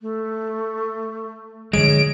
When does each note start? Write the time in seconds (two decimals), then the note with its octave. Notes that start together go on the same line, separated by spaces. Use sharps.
0.01 A3
1.73 D3 F3 F#3 G#3 C#5 D7